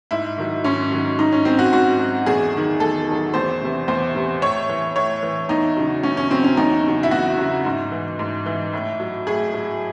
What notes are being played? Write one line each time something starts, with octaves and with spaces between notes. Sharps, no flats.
G#2 E4
D#3 F#3
G#2 C#4
D#3 F#3
G#2 D#4
C#4
F#3 C4
F#4
G#2 F#4
F#3
E2 G#4
D#3 F#3
E2 A4
D#3 F#3
E2 C5
C3 E3
E2 C5
C3 E3
A2 C#5
E3
A2 C#5
E3
E2 D#4
C#3 F#3
E2 C#4
C#4
C#3 F#3 C4
C#4
E2 D#4
C#3 F#3
E4
E2 F#4
C#3 F#3
G#2
E3
G#2
E3
A2
F#3
A2 G#4
F#3